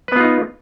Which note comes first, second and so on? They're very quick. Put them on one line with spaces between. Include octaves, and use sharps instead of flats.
B4 B3 F4 D#4